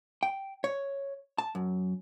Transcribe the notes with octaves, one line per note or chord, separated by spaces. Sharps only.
G5
C#5
A5
F#2